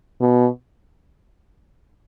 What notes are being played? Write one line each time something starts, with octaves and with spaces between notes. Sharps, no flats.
B2